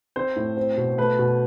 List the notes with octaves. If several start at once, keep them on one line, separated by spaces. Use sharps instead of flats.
C4 C5
A2
C4
B2
A3 B4
B2